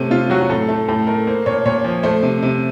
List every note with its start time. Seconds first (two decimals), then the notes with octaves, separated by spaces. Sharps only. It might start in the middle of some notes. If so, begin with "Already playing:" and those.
Already playing: C3 A3 C#4
0.11 C3 F4
0.30 F#3 F#4
0.41 F#4
0.50 A2 A4
0.68 A3
0.88 A2 A4
1.07 A3 A#4
1.27 A#3 C5
1.46 A#2 C#5
1.66 A#2 C#5
1.84 F3
2.03 A3 C5
2.23 C3
2.43 C3